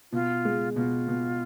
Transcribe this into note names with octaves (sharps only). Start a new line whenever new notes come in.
B2 F4
G#3
B2 F4
B2